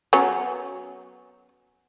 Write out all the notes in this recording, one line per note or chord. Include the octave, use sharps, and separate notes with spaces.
F#3 B3 C#4